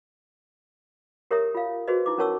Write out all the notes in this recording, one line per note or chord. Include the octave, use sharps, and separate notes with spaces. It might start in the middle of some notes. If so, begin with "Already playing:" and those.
G4 A#4 C#5 E5 A#5 D#6
F4 F5
F#4 G#4 B4 C5 D#5
D#4 E4 D6
C#4 A#4 C#5 A5 C#6 E6